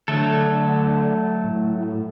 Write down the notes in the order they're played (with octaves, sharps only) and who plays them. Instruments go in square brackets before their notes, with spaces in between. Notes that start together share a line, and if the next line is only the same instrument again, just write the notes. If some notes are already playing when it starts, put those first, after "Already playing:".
[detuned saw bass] D3 [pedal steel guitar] F#3 A3 A4
[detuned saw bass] A2